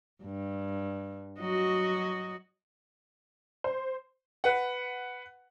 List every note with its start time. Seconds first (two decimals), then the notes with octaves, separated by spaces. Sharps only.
0.23 G2
1.39 F#3 F#4 D#5
3.64 C5
4.44 B4 F#5